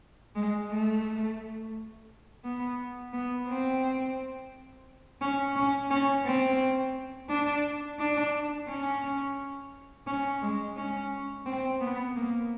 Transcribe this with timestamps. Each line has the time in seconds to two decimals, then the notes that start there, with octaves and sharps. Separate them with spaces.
0.36 G#3
0.70 A3
2.44 B3
3.13 B3
3.48 C4
5.21 C#4
5.56 C#4
5.91 C#4
6.25 C4
7.30 D4
7.99 D4
8.69 C#4
10.07 C#4
10.42 G#3
10.77 C#4
11.46 C4
11.81 B3
12.16 A#3